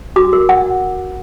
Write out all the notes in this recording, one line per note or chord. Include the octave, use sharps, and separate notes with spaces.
F#4 D6
A#4
F#5